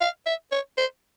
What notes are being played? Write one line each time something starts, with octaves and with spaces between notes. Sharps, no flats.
F5
E5
C#5
C5